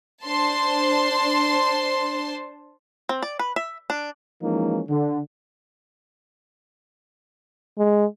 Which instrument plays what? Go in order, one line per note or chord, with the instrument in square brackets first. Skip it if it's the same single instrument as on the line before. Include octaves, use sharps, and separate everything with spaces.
[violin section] D4 C5 A5 C6
[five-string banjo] C4
D5
B4
E5
D4
[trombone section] E3 F3 G#3 A#3 C#4 D#4
D3
[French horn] G#3